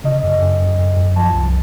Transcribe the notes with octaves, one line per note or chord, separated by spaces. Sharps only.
C#3 D#5
F#2
F#2
F#2
F#2
F#2
F3 A5
C2